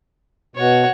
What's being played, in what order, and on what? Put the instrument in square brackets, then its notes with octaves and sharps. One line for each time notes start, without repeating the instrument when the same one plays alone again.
[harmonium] B2 [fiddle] F#4 C#5